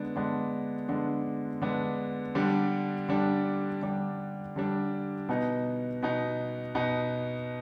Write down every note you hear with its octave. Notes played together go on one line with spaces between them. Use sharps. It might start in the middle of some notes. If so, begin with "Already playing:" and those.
Already playing: D3 G#3 B3 D4
D3 G#3 B3 D4
D3 G#3 B3 D4
D3 G#3 B3 D4
D3 G3 D4
D3 G3 D4
D3 G3 D4
D3 G3 D4
B2 B3 D#4
B2 B3 D#4
B2 B3 D#4